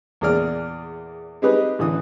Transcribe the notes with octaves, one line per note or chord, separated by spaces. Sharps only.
E2 A#2 G#4 D5 F6
C4 D#4 G4 G#4 B4
A1 D3 E3 D#6